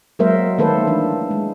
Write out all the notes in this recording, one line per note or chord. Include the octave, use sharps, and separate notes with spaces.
F#3 G#3 A#3 A#4 C5 E5
D#3 A3 A#3 A4 B4 C5
E3 D4
G#3